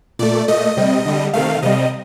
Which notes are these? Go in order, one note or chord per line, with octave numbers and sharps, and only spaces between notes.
A#2 A3 D5
A#2 A3 D#5
C3 G3
D3 G3
C3 D#3 A3 F5
C3 G3 D#5